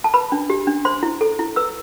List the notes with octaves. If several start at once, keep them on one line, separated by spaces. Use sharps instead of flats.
A5
B4 B5
D4
G4
D4
C5 C6
E4
A4
E4
B4 E6